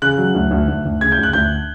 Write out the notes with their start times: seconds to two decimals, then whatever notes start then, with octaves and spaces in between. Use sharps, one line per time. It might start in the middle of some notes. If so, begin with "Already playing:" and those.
0.02 C#3 F#6
0.18 F#3
0.35 D2
0.51 D2
0.68 D2
0.85 D2
1.01 C#3 G#6
1.12 G6
1.19 D2 F#6
1.33 D2 G6